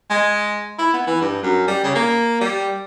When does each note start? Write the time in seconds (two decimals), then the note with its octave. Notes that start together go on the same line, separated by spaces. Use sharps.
0.10 G#3
0.79 E4
0.94 B3
1.07 E3
1.22 G2
1.43 F#2
1.68 G3
1.84 C#3
1.96 A#3
2.41 G3